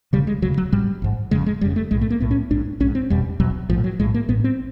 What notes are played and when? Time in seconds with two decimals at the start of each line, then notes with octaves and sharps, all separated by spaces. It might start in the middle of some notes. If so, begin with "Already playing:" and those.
0.13 E1 D2 C#3 G3
0.27 G#3
0.42 E1 D2 C#3 F#3
0.57 F#3
0.72 A1 G#2 G3
1.02 A1 G#2
1.31 F1 F2 C#3 G#3
1.46 G#3
1.61 F1 F2 C#3 G3
1.76 A3
1.91 B1 A2 G#3
2.01 A3
2.10 A#3
2.20 B1 A2 B3
2.31 C#4
2.51 A#1 G#2 D4
2.80 A#1 G#2 C#4
2.95 C4
3.10 F1 E2 B2 G3
3.40 F1 E2 B2 F#3
3.69 A#1 A2 F3
3.84 F#3
3.99 A#1 A2 G#3
4.14 A#3
4.29 A1 A2 B3
4.44 C4